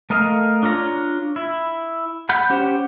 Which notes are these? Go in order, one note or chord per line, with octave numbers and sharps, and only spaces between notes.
A3 A#4 D#5 F5
D4 F4 C#5 A#5
E4
F#5 B5 G6
C#4 G4 C5 F#5